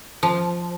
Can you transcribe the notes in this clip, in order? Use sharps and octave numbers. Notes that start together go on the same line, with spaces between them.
F3